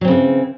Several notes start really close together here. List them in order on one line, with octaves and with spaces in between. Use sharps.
F#3 C4 C#3 E3